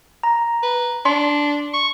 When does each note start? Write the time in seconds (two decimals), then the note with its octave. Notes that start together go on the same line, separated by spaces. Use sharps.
0.23 A#5
0.63 B4
1.05 D4 C6
1.74 C#6